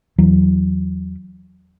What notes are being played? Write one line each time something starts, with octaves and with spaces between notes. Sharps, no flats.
E2 E3 F#3